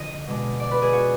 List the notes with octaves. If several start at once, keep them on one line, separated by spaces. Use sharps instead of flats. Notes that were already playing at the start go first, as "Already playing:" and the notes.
Already playing: D3 F3 D4 D#5
B2 G#3 D4
D5
B4
G#4
F#4